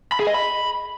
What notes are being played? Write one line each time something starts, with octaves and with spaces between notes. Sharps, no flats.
B5
G#4
D#5
B5